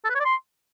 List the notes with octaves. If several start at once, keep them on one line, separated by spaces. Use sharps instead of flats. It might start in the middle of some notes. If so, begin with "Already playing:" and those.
A4
B4
C#5
D5
C6